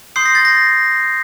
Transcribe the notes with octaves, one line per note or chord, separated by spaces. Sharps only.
C6 D#6 G6 C7
A#6
A6
A#6